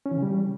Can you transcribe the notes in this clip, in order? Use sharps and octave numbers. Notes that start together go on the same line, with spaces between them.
C#4
E3
C#3
G3